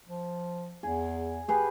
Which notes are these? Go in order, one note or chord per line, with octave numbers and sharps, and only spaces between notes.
F3
E2 G#4
G4 G#4 B4